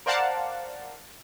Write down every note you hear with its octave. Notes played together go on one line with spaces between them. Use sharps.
A#4 C5 D5 F5 F#5 A5